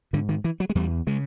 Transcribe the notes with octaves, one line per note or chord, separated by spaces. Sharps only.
G#2 D3
D#3
E3
F#3
G#3
E2 G3
C#3 G#3